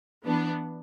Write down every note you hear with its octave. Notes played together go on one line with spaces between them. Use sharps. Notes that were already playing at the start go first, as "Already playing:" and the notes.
E3 B3 D4